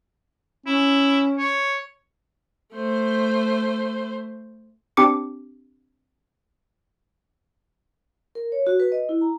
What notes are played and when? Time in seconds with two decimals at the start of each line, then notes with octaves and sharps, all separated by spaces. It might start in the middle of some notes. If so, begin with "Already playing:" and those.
0.66 C#4 E4
1.39 C#5
2.73 A3 C5
4.97 C4 D4 G4 D6 C#7
8.35 A#4
8.52 C#5
8.67 F#4
8.80 B4
8.92 D#5
9.09 E4
9.21 A#5